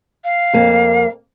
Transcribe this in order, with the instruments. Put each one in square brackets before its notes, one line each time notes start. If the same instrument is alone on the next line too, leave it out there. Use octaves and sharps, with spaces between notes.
[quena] F5
[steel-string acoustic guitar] F2 A#3